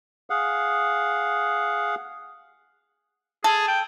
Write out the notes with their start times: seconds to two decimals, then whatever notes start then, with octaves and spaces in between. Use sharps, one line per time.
0.30 G#4 F5 F#5
3.44 G#4 A4
3.68 G5